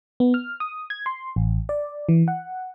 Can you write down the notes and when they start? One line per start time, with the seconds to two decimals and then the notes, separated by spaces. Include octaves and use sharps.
0.20 B3
0.34 F6
0.60 D#6
0.90 G#6
1.06 C6
1.36 A1
1.69 D5
2.09 E3
2.28 F#5